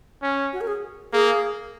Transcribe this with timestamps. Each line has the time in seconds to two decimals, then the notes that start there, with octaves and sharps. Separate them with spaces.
0.22 C#4
0.53 F#4
0.61 A#4
0.67 G#4
1.13 A#3 G#4